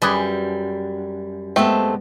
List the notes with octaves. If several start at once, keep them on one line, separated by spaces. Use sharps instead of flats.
F#2 G3 G#4 B4 D5
G#3 A3 B3 C4 G4